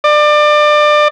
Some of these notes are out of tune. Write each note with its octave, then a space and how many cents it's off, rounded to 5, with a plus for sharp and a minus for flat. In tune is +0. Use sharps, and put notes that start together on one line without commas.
D5 +30